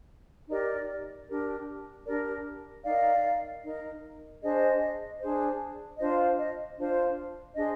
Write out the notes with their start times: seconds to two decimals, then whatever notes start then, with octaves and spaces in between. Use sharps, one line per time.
0.49 D#4 G4 A#4 D5
1.28 D4 G4 A#4
2.06 D4 G4 A#4 D5
2.84 D#4 A#4 D5 F5
3.63 D#4 A#4
4.42 D4 G#4 C5 D#5
5.20 D4 G#4 C5
5.98 D4 F4 C5 D#5
6.38 D#5
6.78 D4 F4 C5
7.55 D4 G#4 C5 D#5